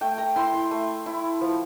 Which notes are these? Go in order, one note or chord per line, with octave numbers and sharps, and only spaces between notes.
A3 G5
A#5
E4 C6
C6
A3
E4
F3